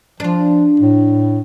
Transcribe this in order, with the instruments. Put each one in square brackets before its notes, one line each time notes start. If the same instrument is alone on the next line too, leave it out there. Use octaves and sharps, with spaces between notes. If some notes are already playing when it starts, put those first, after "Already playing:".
[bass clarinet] F3 [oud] D4 F4
[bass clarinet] A2